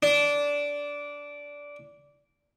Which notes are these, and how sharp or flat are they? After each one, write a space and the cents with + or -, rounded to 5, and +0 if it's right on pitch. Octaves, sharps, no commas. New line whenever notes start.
D4 -15